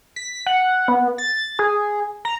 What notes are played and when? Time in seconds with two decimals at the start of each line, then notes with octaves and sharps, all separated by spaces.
0.16 B6
0.46 F#5
0.88 B3
1.18 A6
1.59 G#4
2.25 A#5